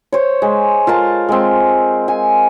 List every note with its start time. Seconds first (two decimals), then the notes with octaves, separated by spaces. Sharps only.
0.12 C5 C#5
0.42 G#3
0.87 F4 A#4 A5
1.29 G#3 C4
2.08 G#5